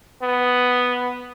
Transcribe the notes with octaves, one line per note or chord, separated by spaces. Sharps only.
B3